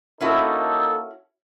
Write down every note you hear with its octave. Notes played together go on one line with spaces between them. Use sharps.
A#3 C#4 D#4 E4 F#4 A4